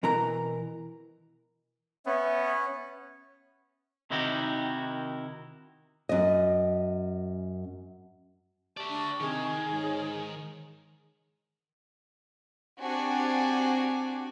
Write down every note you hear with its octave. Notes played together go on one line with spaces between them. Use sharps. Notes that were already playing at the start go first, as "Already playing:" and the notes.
B2 E3 A#4 A#5
B3 C#4 E5
C3 D#3 D#4 E4 F#4 G4
F#2 D#5
G4 D5 E5 A5 C#6
D4
C3 D#3 G#4
G#2 C#5 G#5
C4 D4 F#4 G4 G#5